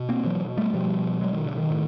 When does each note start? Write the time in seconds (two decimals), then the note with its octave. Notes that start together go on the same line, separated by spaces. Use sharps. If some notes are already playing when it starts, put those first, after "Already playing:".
Already playing: B2
0.09 A#3 C4
0.25 E3 F#3
0.57 G3 A3
0.73 B2 F3 G3
1.21 F#3 G#3
1.34 D#3
1.46 D3
1.58 D#3
1.70 A2